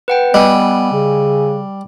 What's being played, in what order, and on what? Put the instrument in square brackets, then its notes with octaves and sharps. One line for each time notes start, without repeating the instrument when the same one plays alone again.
[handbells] B4 F#5 G5
[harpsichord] G3 [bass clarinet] B3 [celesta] D#5 [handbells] G#5 E6 F#6
[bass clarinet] C#3